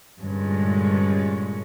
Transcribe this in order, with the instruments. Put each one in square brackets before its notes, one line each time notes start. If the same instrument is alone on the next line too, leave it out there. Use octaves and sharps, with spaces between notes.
[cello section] G2 A#2 D3 G#3 C#4